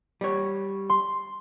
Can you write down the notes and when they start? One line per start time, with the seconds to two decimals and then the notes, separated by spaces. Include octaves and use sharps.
0.21 G3 C#5
0.90 C6